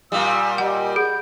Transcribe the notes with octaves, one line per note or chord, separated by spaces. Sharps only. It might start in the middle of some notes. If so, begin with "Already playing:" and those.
A#2 G3 F5 D#6 E6
G4 D#5 F#5
G#4 F#5 B5 G6